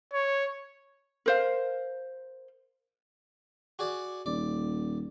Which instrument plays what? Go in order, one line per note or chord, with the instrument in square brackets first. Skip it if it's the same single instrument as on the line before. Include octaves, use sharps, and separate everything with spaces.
[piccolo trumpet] C#5
[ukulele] A#4 C5 F5
[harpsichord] F#4 G#4 D5
[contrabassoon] D#1 [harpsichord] D5